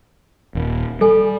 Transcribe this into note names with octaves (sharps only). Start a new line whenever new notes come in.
D#1
G3 A4 G#5